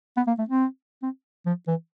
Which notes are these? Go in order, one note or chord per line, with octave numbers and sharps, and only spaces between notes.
B3
A#3
A3
C4
C4
F3
E3